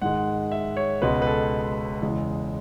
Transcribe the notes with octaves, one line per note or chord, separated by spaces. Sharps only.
G#2 D#3 G#3 F#5
E5
C#5
C#2 B2 G#3 B4
B4
A4
E2 C#3 G#3